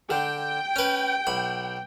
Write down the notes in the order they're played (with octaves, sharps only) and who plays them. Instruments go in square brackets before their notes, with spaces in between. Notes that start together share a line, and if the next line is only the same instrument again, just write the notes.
[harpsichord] D3 [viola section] G5
[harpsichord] C#4 B4
B1 B5